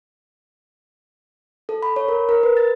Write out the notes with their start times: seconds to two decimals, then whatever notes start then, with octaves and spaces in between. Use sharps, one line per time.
1.69 A4
1.83 B5
1.96 C#5
2.08 A#4
2.29 A#4
2.43 B4
2.57 A6